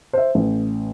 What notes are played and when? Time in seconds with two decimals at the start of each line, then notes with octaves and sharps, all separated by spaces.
0.13 C5 E5
0.35 A1